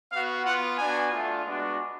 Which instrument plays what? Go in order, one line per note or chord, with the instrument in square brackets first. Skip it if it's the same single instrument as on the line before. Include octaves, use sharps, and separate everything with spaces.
[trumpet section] B3 F#4 F5
B3 F4 F#5
B3 D4 F#4 G#5
A3 D4 F4
G#3 B3 D4 F#4